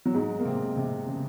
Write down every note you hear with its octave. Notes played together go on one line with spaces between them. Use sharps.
F#3
G#2 G#3
A#3
C3 C4
C3 C4
C#3